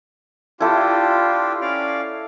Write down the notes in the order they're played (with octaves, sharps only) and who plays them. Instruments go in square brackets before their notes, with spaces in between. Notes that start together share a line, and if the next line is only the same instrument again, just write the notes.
[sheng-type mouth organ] D4 F4 G4 [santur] E4 A4
[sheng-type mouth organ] C#4 D5 F5